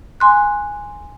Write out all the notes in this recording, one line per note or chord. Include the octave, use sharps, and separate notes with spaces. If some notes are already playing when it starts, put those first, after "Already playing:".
G#5 C6 F#6